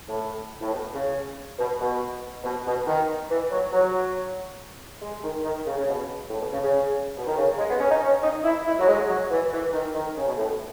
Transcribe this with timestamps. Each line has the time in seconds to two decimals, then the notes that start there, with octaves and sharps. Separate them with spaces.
0.08 A2
0.61 A2
0.73 B2
0.94 C#3
1.58 B2
1.80 B2
2.44 B2
2.66 B2
2.87 D#3
3.30 E3
3.51 F#3
3.73 F#3
5.02 G#3
5.23 D#3
5.44 D#3
5.66 C#3
5.77 C#3
5.88 B2
6.30 A2
6.41 B2
6.52 C#3
6.62 C#3
7.16 B2
7.27 D#3
7.37 C#3
7.58 G#3
7.69 B3
7.80 C#4
7.91 D#4
8.02 C#4
8.23 D#4
8.44 E4
8.66 E4
8.79 F#3
8.87 G#3
9.08 F#3
9.31 E3
9.52 E3
9.73 D#3
9.95 D#3
10.16 C#3
10.27 B2
10.38 A2
10.48 B2